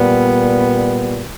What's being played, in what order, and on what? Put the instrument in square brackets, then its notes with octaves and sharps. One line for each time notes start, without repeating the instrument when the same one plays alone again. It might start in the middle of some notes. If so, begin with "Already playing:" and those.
Already playing: [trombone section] A#2 G3 B3